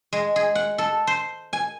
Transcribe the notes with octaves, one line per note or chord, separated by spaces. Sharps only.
G#3
G#4
F#5
A4
C5
G#5